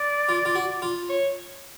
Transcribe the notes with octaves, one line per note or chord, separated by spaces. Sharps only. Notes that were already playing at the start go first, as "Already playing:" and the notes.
Already playing: D5
F4
F4
F#4
F4
C#5